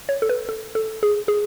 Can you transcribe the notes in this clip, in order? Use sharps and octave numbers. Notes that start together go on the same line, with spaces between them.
C#5
A4
B4
A4
A4
G#4
G#4